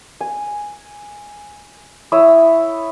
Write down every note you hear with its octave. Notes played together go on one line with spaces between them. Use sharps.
G#5
E4 C#5 D#6 E6